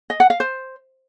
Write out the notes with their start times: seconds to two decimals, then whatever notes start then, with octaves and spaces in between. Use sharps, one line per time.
0.10 D#5
0.20 F#5
0.30 F5
0.40 C5